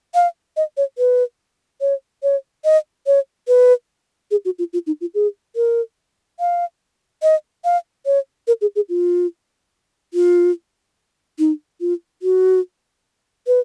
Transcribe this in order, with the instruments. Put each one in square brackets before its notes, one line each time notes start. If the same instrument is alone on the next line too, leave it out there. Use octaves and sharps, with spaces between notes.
[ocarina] F5
D#5
C#5
B4
C#5
C#5
D#5
C#5
B4
G#4
F#4
F4
F4
D#4
F4
G#4
A#4
F5
D#5
F5
C#5
A#4
G#4
G#4
F4
F4
D#4
F4
F#4
B4